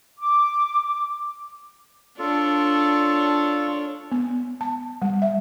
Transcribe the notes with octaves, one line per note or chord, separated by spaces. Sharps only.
D6
D4 F4 A4 C#5
B3
A5
G3
E5